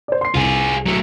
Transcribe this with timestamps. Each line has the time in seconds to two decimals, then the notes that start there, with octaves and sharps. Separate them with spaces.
0.08 C5 D5
0.21 C6 C7
0.35 C2 F4 G#4
0.86 F#3 A3